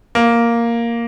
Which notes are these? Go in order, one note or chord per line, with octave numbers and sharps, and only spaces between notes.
A#3